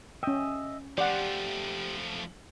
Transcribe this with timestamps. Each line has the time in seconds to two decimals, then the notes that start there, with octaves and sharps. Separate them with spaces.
0.23 C#4 D#5 E5 G5
0.98 F3 A3 G4 D5 F#5 C6